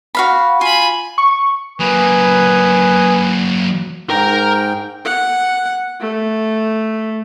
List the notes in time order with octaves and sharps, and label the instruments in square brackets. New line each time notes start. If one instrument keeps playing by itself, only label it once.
[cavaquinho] F#4 F5 B5
[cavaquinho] F4 [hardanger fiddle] G#5 B5
[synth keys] C#6
[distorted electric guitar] F#3 A#3 [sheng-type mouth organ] B4 G#5 D#6
[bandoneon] G#2 G5 [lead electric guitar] A#4 A#5
[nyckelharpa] F#5
A3